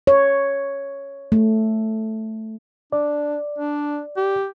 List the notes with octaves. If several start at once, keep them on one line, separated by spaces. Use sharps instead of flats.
C#5
A3
D4 D5
D4
G4